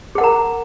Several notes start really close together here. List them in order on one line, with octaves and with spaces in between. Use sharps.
G#4 F#5 A#4 A#5